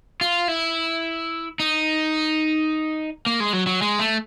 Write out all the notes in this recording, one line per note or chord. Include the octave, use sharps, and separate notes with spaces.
F4
E4
D#4
A#3
G#3
F#3
F#3
G#3
A3